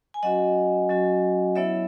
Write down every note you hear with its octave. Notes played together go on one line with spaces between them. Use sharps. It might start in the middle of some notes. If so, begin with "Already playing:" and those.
G#5
F#3 C#4 F#4 D#5 F#5
F#3 C#4 F#4
F#3 B3 E4 C#5 E5